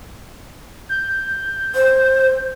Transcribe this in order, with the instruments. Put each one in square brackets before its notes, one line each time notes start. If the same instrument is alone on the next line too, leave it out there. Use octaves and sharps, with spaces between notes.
[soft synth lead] G6
[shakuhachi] C5